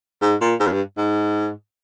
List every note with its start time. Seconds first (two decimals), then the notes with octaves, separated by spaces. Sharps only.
0.22 G#2
0.41 A#2
0.60 G#2
0.67 F2
0.72 G2
0.98 G#2